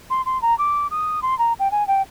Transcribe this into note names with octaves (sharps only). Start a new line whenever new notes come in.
C6
C6
A#5
D6
D#6
C6
A#5
G5
G#5
G5